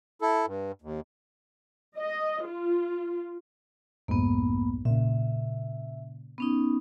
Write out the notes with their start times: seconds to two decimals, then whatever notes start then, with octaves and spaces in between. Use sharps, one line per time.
0.22 E4 A4
0.46 G2
0.82 D#2
1.97 D#5
2.45 F4
4.08 B1 F2 G#2 A#3 B3
4.85 A#2 C#3 E5
6.38 B3 C#4 D#4